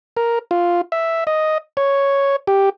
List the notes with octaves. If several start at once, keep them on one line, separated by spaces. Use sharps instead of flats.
A#4
F4
E5
D#5
C#5
G4